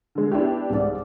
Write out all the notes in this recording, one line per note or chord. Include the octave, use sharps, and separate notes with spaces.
D3 G#3
B3 D4 E4 G4
C2 G#2 D5